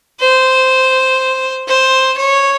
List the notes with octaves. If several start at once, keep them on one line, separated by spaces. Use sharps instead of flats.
C5
C5
C#5